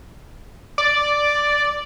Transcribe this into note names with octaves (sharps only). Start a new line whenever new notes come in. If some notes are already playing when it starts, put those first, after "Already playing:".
D5